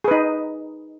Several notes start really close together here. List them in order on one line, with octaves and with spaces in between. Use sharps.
G#4 B4 D#4